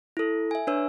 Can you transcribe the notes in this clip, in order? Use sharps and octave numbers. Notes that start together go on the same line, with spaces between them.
E4 A4
E5 G#5
D4 B4 C#5 E6